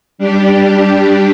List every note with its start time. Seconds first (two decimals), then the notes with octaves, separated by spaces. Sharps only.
0.18 G3 D4 G4